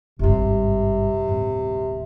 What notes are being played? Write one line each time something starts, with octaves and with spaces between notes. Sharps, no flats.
G#1 G2 C3
D1 G1